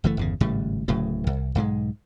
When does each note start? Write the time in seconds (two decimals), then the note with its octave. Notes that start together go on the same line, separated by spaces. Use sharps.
0.04 F#1 E3 A3
0.17 G1 E2 C#3
0.41 G#1 A2 C#3 G3
0.88 D1 A2 C#3 F#3
1.27 C2
1.55 B1 G#2 F3 G#3